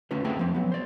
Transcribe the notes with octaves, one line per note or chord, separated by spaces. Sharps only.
D3 A3 C#4 F4 B4
A3 A#3 C4 G#4 G5
F3 C4
F#3 B3
C5 D5